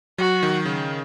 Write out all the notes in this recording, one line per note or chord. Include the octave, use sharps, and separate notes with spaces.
F#3 F#4
D#3
C#3